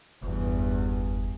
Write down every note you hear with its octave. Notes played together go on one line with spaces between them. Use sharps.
F#1 E2 G2